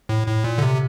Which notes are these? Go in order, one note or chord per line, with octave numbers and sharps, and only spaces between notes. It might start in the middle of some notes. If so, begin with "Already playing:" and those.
A2
A2
A#2
D3
C3